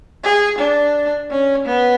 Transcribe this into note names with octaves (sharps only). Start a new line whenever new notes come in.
G#4
D4
C#4
B3